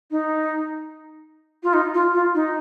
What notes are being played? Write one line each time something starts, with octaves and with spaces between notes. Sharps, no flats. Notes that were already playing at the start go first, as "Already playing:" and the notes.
D#4
F4
D#4
F4
F4
D#4